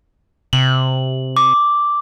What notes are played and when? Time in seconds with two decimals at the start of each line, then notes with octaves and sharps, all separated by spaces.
0.53 C3 F#7
1.37 D6